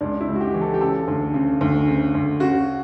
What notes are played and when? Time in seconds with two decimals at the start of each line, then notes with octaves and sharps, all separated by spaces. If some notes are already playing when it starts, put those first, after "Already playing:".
0.01 C#2 D4
0.21 E4
0.28 C#2
0.35 F#4
0.41 G4
0.54 E3
0.61 A4
0.74 G4
0.81 C#3 A4
1.08 D2
1.34 C#3
1.61 D2
1.88 C#3
2.15 D2
2.40 C#3 F#4